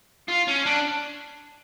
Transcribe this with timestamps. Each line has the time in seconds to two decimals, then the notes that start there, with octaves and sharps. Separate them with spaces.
0.28 F4
0.48 C#4
0.66 D4